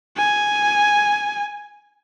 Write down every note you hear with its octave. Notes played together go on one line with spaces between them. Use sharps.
G#5